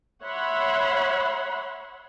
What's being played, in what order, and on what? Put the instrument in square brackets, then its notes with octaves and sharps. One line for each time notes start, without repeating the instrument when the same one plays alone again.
[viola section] C#5 E5 F#5 B5 C6